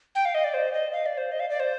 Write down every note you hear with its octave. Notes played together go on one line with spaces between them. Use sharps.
G5
F5
D#5
D5
C5
D#5
F5
D5
C5
D#5
F5
D5
C5